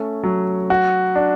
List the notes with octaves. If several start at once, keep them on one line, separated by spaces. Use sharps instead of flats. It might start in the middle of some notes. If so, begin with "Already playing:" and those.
Already playing: A3 C#4
F#3
F#4
D4